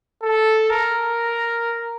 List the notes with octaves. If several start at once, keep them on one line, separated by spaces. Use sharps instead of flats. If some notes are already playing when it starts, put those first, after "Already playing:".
A4
A#4